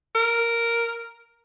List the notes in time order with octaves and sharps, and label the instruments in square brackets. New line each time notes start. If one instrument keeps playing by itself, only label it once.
[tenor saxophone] A#4